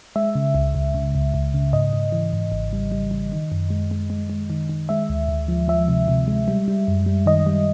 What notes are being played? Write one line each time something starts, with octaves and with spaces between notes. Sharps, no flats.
G#3 E5
C#3
C#2
C#2
C#3
C#2
C#2
C#3
G#2 D#5
G#2
E3
G#2
G#1
G3
G3
G3
D#3
F#2
G#3
G#3
G#3
G#3
D#3
D#3
G#3 E5
D2
D2
F3
F3 E5
C3
C3
G#3
G3
G3
F#2
G3
D#3 D#5
G3